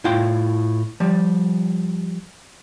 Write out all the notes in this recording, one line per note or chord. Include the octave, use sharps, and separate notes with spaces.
A2 E4 F4 G5
F3 G3